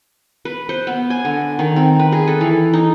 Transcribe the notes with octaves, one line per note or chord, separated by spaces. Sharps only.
B4
C5
B3
G#5
D3
D#3
C4
B4
G#4
A4
E3
D#4